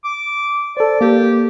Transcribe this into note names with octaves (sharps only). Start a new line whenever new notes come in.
D6
A4 C5 D5
A#3 G4